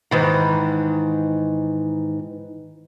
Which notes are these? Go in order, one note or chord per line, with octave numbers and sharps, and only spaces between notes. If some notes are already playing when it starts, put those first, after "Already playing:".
G#2 D#3 E3